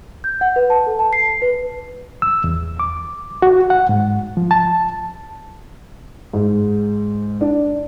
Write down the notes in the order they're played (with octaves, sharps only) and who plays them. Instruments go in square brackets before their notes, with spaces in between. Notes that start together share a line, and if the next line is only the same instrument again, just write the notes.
[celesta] G6
F#5
B4
A5
A4
A5
C7
B4
[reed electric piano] E6
E2
D6
F#4
F#5
G#2
F3
A5
[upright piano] G#2
D4